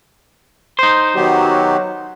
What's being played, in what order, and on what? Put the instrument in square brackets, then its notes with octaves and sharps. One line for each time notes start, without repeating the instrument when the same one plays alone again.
[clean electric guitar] D#4 C5
[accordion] D#3 B3 G4 [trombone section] F#3